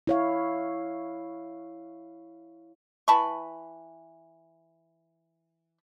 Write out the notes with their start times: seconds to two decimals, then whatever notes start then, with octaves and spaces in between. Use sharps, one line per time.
0.07 E4 C#5 F5
3.08 E3 A5 B5 C#6